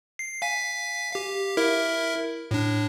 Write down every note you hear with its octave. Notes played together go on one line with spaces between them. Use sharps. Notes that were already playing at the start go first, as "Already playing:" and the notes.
C7
F5 G#5 B6
G4 F5
E4 A#4 E5
A2 D4